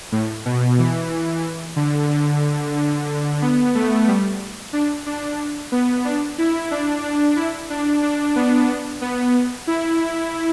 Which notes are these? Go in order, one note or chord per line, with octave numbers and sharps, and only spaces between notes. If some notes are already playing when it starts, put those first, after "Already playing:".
A2
B2
E3
D3
D3
D3
B3
A3
G3
D4
D4
B3
D4
E4
D4
D4
E4
D4
D4
B3
B3
E4